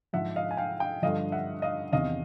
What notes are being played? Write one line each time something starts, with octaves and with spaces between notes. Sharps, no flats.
G#2 F3 E5 F#5
D#5 F5
G#5
F5 G5
F5 G5
G2 D3 F3 D#5 F5
E5 F#5
D#5 F5
E2 C3 D#3 D#5 F5